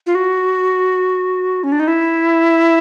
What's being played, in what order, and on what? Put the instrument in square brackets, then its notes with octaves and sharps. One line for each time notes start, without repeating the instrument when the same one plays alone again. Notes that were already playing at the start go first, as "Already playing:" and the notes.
[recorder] F4
F#4
C#4
D4
D#4
E4